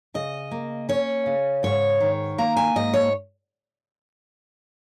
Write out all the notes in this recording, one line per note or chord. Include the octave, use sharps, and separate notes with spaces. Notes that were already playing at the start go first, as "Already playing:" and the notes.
C#3 D#5
A#3
C#4 C#5
C#3
G#2 C#5
D#3
A#3 A#5
G#5
G#2 D#5
C#5